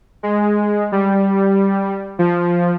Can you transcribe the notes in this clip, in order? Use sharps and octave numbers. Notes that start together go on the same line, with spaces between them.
G#3
G3
F3